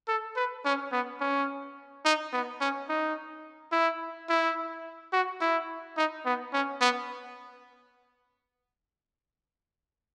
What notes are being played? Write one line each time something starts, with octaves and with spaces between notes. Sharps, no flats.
A4
B4
C#4
B3
C#4
D#4
B3
C#4
D#4
E4
E4
F#4
E4
D#4
B3
C#4
B3